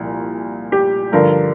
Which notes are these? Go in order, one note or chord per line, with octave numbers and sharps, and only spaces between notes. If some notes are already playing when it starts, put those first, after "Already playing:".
Already playing: C2 A#2 F3
G4
G2 D3 F3 A#4